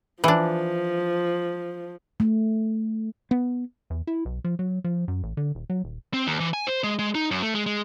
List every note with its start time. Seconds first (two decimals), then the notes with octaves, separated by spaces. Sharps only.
0.24 E3 F3 D4
2.20 A3
3.31 B3
3.90 E2
4.07 E4
4.25 B1
4.44 F3
4.59 F#3
4.84 F3
5.08 F#2
5.23 A1
5.37 D3
5.55 D#1
5.70 F#3
5.84 D#1
6.14 C4
6.27 D#2
6.40 E3
6.54 G#5
6.67 C5
6.84 G#3
6.99 G#3
7.15 D#4
7.31 F#2
7.43 A3
7.55 G#3
7.66 G#3